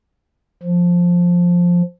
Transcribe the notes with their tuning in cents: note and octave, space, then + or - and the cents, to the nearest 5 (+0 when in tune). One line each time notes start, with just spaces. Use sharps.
F3 +5